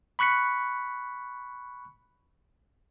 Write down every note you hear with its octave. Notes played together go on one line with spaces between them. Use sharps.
B5 C#6 F#6 B6 C#7